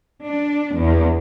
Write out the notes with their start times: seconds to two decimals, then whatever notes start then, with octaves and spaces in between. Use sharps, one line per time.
0.23 D4
0.78 E2